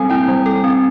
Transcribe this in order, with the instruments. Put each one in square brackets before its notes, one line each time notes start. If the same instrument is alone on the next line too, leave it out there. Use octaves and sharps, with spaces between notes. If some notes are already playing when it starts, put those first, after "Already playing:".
Already playing: [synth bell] G3 C4 A4 [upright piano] G#5
[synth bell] E4 [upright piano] G5
[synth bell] G3
A4
C4